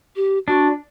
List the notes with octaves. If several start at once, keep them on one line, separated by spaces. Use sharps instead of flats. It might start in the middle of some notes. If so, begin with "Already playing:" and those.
G4
D4 F#4